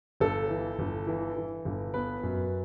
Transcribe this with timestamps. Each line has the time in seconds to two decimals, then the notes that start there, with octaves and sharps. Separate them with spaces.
0.20 G1 A4
0.50 E3
0.79 G1
1.07 E3
1.37 E3
1.65 G1
1.94 B3 B4
2.23 F#2